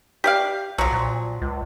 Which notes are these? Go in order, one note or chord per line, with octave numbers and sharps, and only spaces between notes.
G4 D5 F5
B1 F3 F#3
A#2
C#2